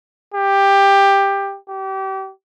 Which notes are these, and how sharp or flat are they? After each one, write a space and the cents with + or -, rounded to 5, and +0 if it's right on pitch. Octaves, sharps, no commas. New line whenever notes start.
G4 +15
G4 -30